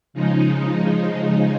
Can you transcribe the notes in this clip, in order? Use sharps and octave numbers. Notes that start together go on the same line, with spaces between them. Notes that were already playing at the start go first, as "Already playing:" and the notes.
C#3 F3 G#3 D#4